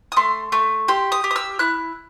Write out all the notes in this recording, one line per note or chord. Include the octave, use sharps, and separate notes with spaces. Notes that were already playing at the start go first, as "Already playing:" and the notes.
D#6
A3 C6
A3
G4 C6
D#6
G4
D#6
E6
E4 F#6